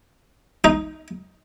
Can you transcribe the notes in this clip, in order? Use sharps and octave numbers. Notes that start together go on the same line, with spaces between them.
D#4